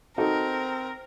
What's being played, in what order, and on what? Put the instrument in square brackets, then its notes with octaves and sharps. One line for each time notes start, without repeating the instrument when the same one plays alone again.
[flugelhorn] C4 [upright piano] D#4 F#4 A4 [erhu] A#4